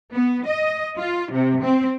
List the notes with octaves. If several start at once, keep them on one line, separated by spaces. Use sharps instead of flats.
B3
D#5
F4
C3
C4